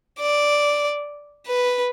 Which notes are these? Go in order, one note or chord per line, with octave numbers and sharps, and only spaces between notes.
D5
B4